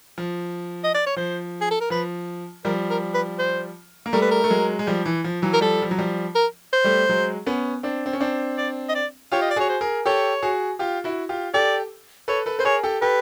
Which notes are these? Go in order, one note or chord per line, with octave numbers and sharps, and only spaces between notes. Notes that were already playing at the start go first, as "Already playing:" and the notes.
F3
D#5
D5
C#5
F3 C5
G#4
A4
A#4
F3 B4
F3 G3 A#4
A#4
B4
C5
A#3
G3 A3 A#4
B4
A#4
A3
F#3 G#3
G#3
F3 G3
E3
F3
E3 F#3
A#4
F3 G3 A4
F3
F#3
F3 G3
A#4
C5
G3 A3
F#3 G#3
B3 C#4
C4 D4
C4
C#4
C4 D4
D5
D#5
D5
F4 G4 C#5
D#5
D5
F#4 G#4 C#5
C5
G#4 A#4
G4 A4 C#5
F#4 G#4
F4 G4
E4 F#4
F4 G4
G4 A4 D5
A4 B4 C#5
A4 B4
B4 C5
G#4 A#4 C#5
G4 A4
G4 A4 B4